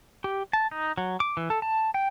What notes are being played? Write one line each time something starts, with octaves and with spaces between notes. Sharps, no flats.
G4
A5
D#4
F#3
D6
E3
A4
A5
G5